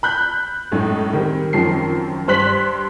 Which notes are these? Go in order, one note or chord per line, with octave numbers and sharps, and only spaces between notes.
B5 F#6 G6
F#2 A2 G#3 D#4
D#3 G3 C4
F#2 D#3 F3 C4 C7
G2 C5 C6 F#6 B6 F#7